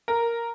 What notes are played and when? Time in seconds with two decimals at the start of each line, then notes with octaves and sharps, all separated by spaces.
0.08 A#4